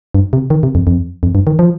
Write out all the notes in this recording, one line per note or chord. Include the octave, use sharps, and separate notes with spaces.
G2
C3
D#3
C3
F2
F2
F2
G2
D#3
F3